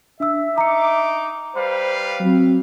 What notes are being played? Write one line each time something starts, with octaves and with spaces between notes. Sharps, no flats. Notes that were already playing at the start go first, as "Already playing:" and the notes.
D4 E5 E6
D#4 A#5 D6 C#7
G3 B4 C5 F5
F#3 C4